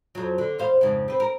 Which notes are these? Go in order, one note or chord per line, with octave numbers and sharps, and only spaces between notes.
F2 F#3
D3
E2 C5 F5
F2 G#2 C#3
C4 B4
A#4